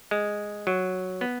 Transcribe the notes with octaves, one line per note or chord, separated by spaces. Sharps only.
G#3
F#3
B3